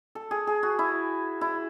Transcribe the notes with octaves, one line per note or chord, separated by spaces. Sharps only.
A4
G#4
G#4
F#4
E4
E4